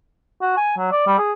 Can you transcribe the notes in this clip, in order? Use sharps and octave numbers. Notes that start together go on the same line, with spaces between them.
F#4
G#5
F#3
D5
G3
G#4